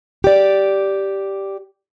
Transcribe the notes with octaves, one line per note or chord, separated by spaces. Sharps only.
G4 D5